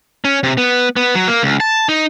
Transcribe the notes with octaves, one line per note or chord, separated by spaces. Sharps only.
C#4
C3
B3
B3
F#3
A#3
C#2
A5
D#4